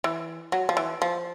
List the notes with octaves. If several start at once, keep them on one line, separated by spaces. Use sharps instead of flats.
E3
F#3
F3
E3
F3